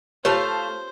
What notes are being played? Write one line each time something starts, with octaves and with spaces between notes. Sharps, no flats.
A3 F4 G4 C5 C#5 F5 A5